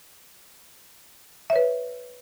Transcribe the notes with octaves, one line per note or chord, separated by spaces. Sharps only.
B4 C#5 E5